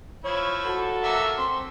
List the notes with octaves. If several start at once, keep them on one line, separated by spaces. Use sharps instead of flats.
F3 E4 C#5
F#4 A4
F#3 A#3 E5
C4 C6